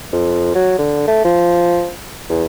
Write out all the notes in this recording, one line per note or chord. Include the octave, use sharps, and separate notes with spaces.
F2
F#3
D3
A3
F3
E2